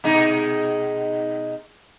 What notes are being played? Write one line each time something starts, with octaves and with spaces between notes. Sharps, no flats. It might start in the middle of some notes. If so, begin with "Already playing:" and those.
B2 G#3 D#4